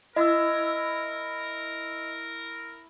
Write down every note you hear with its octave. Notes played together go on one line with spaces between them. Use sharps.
E4 A#4 D#5 E6